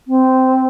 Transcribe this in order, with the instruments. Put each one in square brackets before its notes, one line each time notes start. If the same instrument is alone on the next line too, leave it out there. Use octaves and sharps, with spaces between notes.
[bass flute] C4